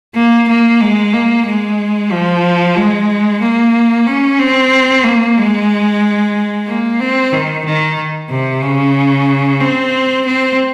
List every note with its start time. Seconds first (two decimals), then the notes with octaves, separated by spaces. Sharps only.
0.15 A#3
0.48 A#3
0.81 G#3
1.13 A#3
1.46 G#3
2.12 F3
2.76 G#3
3.41 A#3
4.07 C#4
4.39 C4
5.04 A#3
5.37 G#3
6.67 A#3
7.00 C4
7.33 D#3
7.65 D#3
8.30 C3
8.62 C#3
9.61 C4
10.26 C4